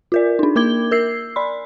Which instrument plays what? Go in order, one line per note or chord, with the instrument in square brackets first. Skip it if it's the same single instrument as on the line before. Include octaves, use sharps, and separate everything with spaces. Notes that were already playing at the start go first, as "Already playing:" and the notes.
[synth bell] F4 A#4 D5
D4 D#4
A#3 A#4 D6 G#6 G7
A#4 E6 C7
D5 B5 C6